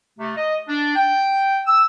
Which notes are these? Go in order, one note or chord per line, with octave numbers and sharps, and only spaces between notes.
C3 A3
D#5
D4
G5
E6